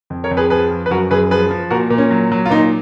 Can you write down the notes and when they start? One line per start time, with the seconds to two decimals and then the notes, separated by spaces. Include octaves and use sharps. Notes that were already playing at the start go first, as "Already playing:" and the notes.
0.10 F2
0.24 A#4 C#5
0.31 F2
0.37 G#4 B4
0.50 F3 G#4 B4
0.71 F3
0.86 B4
0.90 F#2 F#4 A#4
1.11 F#2 G#4 B4
1.31 F3 G#4 B4
1.50 F3
1.70 A#2 F#4 A#4
1.90 A#2
1.98 C#4
2.11 F#3
2.32 F#3
2.46 F4
2.50 A#2 D#4